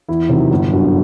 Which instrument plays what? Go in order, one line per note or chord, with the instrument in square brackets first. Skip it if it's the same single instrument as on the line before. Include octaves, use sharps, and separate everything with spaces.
[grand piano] E2 E4
C3 D#3 F#3
G1
F#2 D3